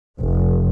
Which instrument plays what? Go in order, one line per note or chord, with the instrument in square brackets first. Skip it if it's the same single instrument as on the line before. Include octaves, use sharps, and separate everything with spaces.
[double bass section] F1